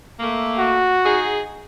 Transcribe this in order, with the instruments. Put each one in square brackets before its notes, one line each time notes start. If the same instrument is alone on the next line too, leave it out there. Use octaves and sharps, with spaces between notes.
[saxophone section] A3 A#3
[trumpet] F#4
[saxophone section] D#4 G#4